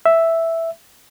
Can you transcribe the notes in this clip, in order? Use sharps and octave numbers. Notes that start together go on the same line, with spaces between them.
E5